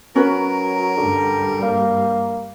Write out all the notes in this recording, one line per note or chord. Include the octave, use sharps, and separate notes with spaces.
F#3 C#4 F#4 A#4 B4
G2 D3 G3
A#3